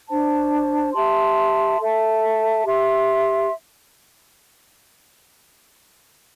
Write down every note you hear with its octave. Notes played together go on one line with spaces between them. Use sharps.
D4 C5 A5
G4 E5 A5 C6
A4 E5 A5
G4 E5 C6